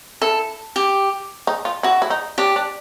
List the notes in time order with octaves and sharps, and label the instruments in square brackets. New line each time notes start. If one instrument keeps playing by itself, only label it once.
[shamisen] E4 [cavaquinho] A4
[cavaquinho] G4
[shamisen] D#4
F4
[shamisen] E4 [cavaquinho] F#4
[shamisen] E4
D#4
[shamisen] D4 [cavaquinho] G4
[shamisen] D4